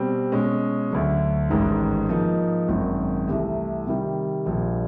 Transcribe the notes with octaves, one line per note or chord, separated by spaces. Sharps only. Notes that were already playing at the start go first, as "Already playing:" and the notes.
Already playing: B2 G3 C4
B2 G#3 C#4
D2 D3 F#3
A1 G#2 D#3 G#3
G#2 F3 A#3 D#4
G#1 F#2 D#3 G#3
C2 C3 E3 A3
C3 D#3 G3
A#1 A#2 G3